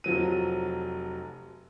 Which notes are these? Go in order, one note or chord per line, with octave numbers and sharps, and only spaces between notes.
F1 F3 F#3 D#7